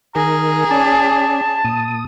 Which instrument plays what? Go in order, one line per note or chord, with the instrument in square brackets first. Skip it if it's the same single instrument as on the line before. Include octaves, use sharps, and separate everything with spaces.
[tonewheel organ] D#3 A#4 [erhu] G#4 [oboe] A#5
[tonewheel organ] C#4 D5 [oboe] A5
[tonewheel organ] A#2 D#6